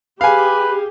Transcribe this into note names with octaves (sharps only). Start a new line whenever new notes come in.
G4 G#4 B4 F5 G#5